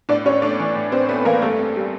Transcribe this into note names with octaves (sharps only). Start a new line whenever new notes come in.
A2 D4 D5
C#4 C#5
A3 D4 D5
E3
A2
C4 C#4 C5
A3 B3 B4
E3 A#3 A#4
G2 A3 A4
C4
G3